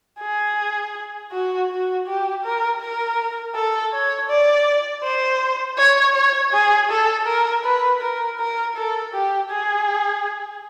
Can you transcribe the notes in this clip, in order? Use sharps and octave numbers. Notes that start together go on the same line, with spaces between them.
G#4
F#4
F#4
G4
A#4
A#4
A4
C#5
D5
C5
C#5
C#5
G#4
A4
A#4
B4
A#4
A#4
A4
G4
G#4